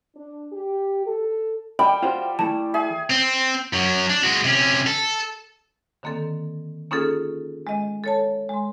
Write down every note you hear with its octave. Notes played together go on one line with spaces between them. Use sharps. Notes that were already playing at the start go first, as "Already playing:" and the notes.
D4
G4
A4
G3 G5 B5
F4 F#4 C5
E3 A3 A5
G#4 E5
C4
F#2 F#3
D4
G#3 F#4
C3 C#4
A4
D3 D#3 A#3 C4 A4
A#3 C#4 D#4 F4 G#4 A4
G#3 D#5
A4 C#5 A5
G#3 C6